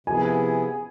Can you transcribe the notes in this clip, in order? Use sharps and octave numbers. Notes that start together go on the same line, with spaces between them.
C3 F3 B3 E4 G#4 G#5